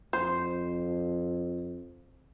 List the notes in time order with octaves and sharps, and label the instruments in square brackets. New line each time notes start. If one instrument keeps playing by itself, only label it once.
[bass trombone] F2 [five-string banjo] C5